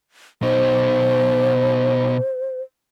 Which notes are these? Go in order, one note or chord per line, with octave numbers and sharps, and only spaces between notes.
B2 D#4 C5